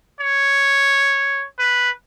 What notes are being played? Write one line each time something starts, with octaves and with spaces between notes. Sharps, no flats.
C#5
B4